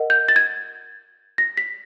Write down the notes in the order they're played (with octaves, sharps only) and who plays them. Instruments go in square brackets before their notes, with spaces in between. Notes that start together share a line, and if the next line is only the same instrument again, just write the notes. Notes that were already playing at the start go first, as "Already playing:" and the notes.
Already playing: [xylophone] A#4 D#5 F#5
G6
A6
G#6
A#6
B6